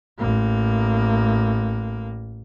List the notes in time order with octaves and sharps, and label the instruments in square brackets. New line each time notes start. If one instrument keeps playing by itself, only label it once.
[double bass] A1 A#3